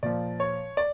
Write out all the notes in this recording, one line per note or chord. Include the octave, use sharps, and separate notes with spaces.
A#2 F3 D5
C#5
D5